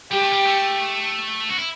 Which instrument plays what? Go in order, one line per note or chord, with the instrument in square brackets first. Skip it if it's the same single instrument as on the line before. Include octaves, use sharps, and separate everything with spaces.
[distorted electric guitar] G3 [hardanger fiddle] G4
[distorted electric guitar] A3
G3
A3
F#4
E4